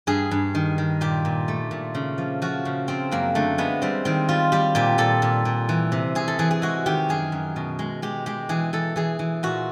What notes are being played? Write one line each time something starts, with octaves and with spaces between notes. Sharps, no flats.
G2 G#4
G2
D#3
D#3
A#2 G4
A#2
A3
A#2
C#3
F3
F3 F#4
C#3
F3 C4
F#2 A#3
D3 A3
G#3 B3
G3 C4
D#3 C4
G3 F4
G3 G4
A#2 G4
A#2 A4
A#2
A#2
E3
C3
C3 G#4
A4
E3 G#4
G#4
G#3 F#4
D#3 G4
F#2 G#4
F#2
B2
G#3
G#3 G4
G#3 G4
E3 G#4
E3 A4
E3 G#4
E3
A#2 F#4